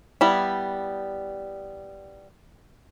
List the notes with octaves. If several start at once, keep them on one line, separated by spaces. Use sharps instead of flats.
G3 B3 E4